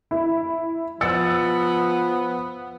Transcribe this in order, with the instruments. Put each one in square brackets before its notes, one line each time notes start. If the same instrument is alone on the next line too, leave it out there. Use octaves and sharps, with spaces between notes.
[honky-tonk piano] E4
[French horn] F3 [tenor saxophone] B3 [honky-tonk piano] E6 A6 C#7